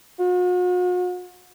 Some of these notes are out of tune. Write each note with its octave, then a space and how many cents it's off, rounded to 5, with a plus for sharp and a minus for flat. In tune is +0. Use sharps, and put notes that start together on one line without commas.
F#4 -45